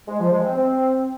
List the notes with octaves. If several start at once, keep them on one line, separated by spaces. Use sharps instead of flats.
G#3
F3
G#3
C4
C4